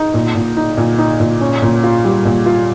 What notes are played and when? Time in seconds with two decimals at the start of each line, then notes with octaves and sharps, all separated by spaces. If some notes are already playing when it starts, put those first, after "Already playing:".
Already playing: D#4
0.14 A#2
0.35 A#2
0.57 D#4
0.77 A#2
0.99 D#4
1.20 A#2
1.41 C#4
1.62 A#2
1.84 F4
2.05 G3
2.25 A#2
2.46 F4